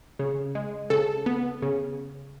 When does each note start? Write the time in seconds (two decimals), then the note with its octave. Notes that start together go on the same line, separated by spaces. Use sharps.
0.19 C#3
0.55 G#3
0.90 C#3 A4
1.26 B3
1.62 C#3